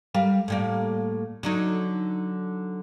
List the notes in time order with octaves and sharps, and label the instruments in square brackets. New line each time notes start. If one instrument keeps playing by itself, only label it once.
[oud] G3 A#4 F5
A2 G3 A#3
D3 F#3 D#4